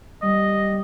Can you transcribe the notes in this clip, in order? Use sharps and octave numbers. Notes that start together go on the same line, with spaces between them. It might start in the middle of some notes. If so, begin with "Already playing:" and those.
G3 D#5